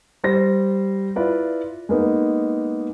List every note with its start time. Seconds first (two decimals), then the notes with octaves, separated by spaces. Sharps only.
0.24 G3 C5 A#6
1.16 E4 F4 B4 D5
1.89 G#3 A#3 B3 D#4